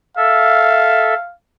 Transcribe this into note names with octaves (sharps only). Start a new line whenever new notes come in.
A4 E5 F5